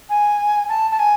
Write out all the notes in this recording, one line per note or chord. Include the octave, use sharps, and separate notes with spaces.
G#5
A5
A5
G#5